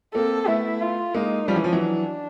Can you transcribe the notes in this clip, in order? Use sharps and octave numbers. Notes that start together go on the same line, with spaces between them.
A#3 C4 A4
A3 B3 E4
F4
G#3 A#3 D#4
F3 G3 C#4
E3
F3
E3 F#3
D4